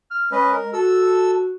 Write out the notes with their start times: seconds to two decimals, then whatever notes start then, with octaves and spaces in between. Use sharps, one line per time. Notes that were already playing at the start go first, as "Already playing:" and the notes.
0.11 F6
0.32 G#3 C#4 B4 D#5
0.52 A#4
0.73 F#4 A4 E6